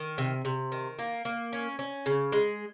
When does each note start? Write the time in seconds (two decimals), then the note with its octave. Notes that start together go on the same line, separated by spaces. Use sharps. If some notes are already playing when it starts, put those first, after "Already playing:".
Already playing: D#3
0.18 C3
0.45 C3
0.72 D#3
0.99 A#3
1.25 A#3
1.53 C#4
1.79 C#4
2.06 C#3
2.32 G#3